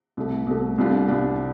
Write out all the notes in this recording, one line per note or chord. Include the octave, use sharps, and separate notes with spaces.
C2 C3 A3
C2 C3 A3
C2 C3 G3 D4 F4
C2 C3 G3 D4 F4